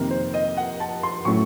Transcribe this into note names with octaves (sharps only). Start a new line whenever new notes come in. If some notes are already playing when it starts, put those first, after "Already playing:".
Already playing: F2 C3 D#3 A#3 A#4
C5
D#5
F#5
A5
C6
A2 F#3 A3 C#4 C#6